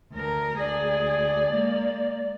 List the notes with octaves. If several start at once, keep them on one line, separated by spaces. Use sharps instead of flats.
D2 A#4
D2 G#4 D5
G#3 A#3